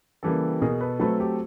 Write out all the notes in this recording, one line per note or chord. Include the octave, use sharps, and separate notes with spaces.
C#3 E3 G3 A#3 G4 A4
B2 G#4 A#4
A4 B4
F#3 A3 C4 A4 B4
G4 A4